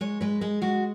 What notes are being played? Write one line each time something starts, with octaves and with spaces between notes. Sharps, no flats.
G#3 C#5
G#3 B4
G#3 G#4
G#3 F#4